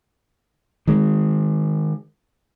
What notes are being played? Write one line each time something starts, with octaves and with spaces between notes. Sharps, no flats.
D#3 G#3